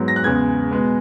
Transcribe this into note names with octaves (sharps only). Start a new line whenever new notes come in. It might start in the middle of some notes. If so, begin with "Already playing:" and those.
Already playing: G#2 F#3 B3
A#6
F#6
E2 C#3 G#3 B3 G#6
B2 G#3 B3